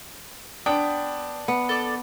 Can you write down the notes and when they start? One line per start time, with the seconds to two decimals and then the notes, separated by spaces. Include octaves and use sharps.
0.66 B3 D4 G5
1.48 B3
1.69 A4 D5